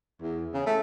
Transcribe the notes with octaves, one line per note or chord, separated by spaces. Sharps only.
E2
C#3
A3